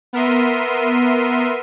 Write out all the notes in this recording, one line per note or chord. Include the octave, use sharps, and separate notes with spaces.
B3 A#4 E5 C6 D#7